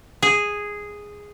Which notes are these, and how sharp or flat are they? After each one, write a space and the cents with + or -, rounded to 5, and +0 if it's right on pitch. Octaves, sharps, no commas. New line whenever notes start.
G#4 -5